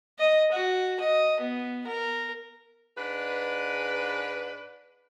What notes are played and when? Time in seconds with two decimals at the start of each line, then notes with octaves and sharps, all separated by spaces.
0.19 D#5
0.52 F#4
1.00 D#5
1.40 B3
1.86 A#4
2.97 G#2 D4 B4